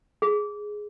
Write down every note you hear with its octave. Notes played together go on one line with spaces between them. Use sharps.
G#4